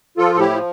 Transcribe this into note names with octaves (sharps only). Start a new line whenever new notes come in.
F3 F4 A4
A2 A4
E4 G4
F3